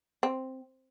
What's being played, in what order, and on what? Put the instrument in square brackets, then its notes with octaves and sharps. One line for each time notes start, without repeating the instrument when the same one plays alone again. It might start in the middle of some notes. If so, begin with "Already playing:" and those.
[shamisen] C4